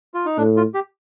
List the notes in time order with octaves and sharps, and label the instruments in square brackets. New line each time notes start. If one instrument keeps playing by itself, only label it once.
[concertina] F4
D#4
[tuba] A2 [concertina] D4
[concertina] F4
G4